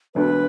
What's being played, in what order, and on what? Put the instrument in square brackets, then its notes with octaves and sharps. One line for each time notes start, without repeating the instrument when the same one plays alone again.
[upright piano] E1 D2 D3 A3 [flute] B4